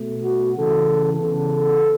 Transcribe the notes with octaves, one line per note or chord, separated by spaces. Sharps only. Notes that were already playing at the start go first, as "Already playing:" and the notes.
Already playing: B2 A3
F#4
C#3 E3 A3 A4
C#3 E3 B3 A4